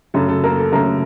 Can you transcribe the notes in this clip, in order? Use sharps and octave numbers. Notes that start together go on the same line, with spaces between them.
F#2 C#3 A3 A4
A4
A#3 A#4
A4
F#2 C#3 A3 A#4
A4